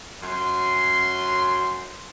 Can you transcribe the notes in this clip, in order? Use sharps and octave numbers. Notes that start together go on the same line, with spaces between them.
F#2 C6